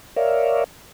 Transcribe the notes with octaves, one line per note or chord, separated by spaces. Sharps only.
A#4 C#5 D5 E5 F5